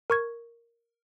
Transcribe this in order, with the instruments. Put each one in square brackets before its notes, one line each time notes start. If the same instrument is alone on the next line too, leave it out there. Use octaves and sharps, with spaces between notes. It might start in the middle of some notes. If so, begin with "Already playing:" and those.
[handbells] A#4 C#6 G#6